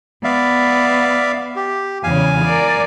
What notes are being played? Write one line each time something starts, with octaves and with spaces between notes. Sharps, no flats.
B3 D5 E5 F5
G4
E2 C#3 F5 G#5
A#4 D5